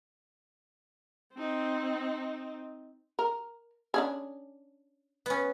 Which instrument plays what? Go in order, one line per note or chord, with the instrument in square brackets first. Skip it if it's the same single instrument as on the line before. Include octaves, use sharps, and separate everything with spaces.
[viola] C4 D#4
[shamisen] A#4
C#4 D4 G#4
[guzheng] B3 C#4